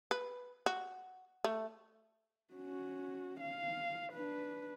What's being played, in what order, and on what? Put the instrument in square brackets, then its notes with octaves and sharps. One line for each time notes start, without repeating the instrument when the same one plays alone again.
[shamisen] B4
F#4
A3
[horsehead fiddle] C#4 F#4
F5
D4 B4